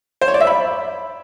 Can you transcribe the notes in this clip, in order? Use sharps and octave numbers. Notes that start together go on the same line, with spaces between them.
C5
C#5
D5
E5
B5